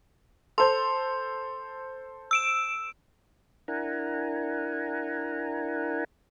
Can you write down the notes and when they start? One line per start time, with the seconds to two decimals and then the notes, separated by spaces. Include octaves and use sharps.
0.58 A4 C5 C6
2.31 E6 D7 E7
3.68 D4 E4 A#4 F#5 G#5 A#5